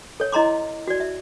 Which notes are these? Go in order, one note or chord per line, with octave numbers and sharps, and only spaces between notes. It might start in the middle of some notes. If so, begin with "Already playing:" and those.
A4 C#5
E4 D#5 A#5 C6 D6
F#4 D5
E5